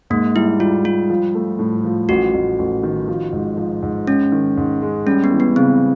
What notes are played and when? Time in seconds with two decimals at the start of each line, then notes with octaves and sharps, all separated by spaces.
0.10 G#2 A#3
0.35 G3 E4
0.60 G3 F4
0.85 G3 F4
1.10 F3
1.35 A3
1.59 A2
1.84 F3
2.09 A1 F#4
2.34 A1
2.59 A1
2.83 D#3
3.08 F3
3.33 G#2
3.57 F3
3.82 G#2
4.07 G#3 C#4
4.32 D#3
4.57 G#2
4.82 G#3
5.07 G3 C#4
5.24 B3
5.31 E3
5.40 B3
5.56 C#3 C4